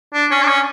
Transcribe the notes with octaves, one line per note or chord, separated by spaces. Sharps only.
D4
C#4
D4
C#4